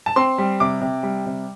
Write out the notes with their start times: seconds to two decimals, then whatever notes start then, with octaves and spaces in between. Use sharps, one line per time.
0.06 A5
0.16 C4 C6
0.38 G3
0.60 C3 D6
0.81 C3
1.03 G3
1.26 C3